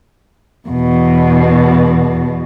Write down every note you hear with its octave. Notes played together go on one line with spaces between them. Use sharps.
E2 B2